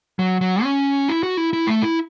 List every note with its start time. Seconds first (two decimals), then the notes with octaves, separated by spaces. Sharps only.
0.19 F#3
0.41 F#3
0.63 C#4
1.08 E4
1.23 F#4
1.37 E4
1.53 E4
1.67 A3
1.82 E4